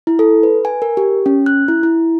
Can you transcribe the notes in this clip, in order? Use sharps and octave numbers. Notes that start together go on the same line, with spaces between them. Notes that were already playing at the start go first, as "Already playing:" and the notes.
E4
A4
B4
G#5
A#4
G4
C#4
F#6
E4
E4